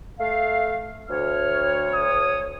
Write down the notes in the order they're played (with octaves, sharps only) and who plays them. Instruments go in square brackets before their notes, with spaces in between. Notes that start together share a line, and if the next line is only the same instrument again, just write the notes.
[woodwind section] A3 F5
[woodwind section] D2 C#5 [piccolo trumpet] F6
[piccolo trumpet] D#6